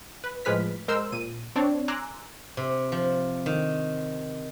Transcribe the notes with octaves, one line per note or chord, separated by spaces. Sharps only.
B4
A2 F3 G#3 B4 F6 B6
G#3 A#4 C5 C6 E6
A#2 D#7
C4 D4 C#5 D5
G#5 A#5 C6 D6 E6 F#6
C3
F3
D#3